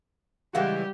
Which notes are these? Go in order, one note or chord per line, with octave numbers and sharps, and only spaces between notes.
C#3 E3 G3 G#3 G4 F5 F#5